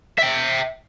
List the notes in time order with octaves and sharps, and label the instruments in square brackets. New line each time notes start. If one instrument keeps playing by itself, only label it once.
[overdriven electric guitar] E5 G5